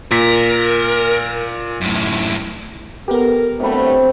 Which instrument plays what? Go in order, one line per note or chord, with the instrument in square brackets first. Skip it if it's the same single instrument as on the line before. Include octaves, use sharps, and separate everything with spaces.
[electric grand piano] A#2 B6 [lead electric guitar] A#4
[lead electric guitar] F#2 A2
[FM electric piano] B3 G4 [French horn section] A4 A#4
[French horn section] G2 F#3 A3 [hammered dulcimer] C3 B5